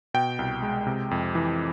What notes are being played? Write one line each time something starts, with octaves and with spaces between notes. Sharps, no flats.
B2 G5
C2
G#3
C3
F2
E3